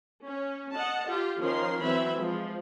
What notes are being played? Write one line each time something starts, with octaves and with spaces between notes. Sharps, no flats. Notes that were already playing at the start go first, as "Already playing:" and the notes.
C#4
D#5 F#5 A5
F4 G4
D#3 F3 C#4 A#4 C6
E3 F#3 C4 E5 B5
F3 G#3